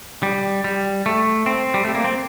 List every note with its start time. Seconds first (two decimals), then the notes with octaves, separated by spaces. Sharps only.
0.23 G3
0.64 G3
1.06 A3
1.46 C4
1.74 G3
1.85 A3
1.95 A#3
2.04 C4